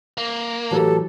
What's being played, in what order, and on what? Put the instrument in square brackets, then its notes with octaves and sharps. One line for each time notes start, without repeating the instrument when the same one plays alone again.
[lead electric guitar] A#3
[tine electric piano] A2 E3 F#3 [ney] G4 [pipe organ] A4